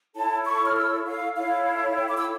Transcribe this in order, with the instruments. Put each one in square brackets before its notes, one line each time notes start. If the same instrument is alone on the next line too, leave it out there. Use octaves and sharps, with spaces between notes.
[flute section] E4 A4 C#5 A5
C#6
F6
E6
F5
E4 A4 C#5 F5
G5
D6
E6